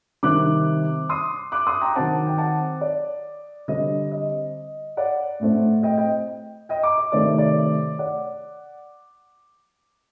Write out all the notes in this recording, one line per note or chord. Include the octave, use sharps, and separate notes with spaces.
C3 D#3 G3 D6 F#6
C6 D#6
D6 F#6
C6 D#6
G5 A#5
D#3 F#3 C4 F#5 A5
G5
F#5 A5
D5
D3 G3 C4 D#5
D#5
D5 F#5
A2 A3 C4
D#5 G5
D#5 G5
D#5 G5
A#5 D6
D#5
C3 D#3 A3 C4 D5
D5
D5 F#5